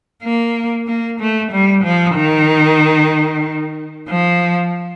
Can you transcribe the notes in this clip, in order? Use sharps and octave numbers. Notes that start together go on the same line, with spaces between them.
A#3
A#3
A3
G3
F3
D#3
F3